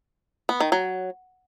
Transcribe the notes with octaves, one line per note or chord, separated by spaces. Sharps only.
B3
D#3
F#3